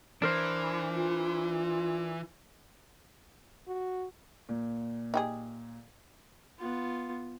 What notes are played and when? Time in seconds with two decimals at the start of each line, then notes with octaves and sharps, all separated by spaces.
0.22 E3 D4 A#4 C5
0.94 F4
3.68 F#4
4.49 A#2
5.14 D#4 G4 G#4
6.59 B3 F4